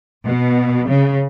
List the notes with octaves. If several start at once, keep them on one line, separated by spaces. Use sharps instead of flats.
B2
C#3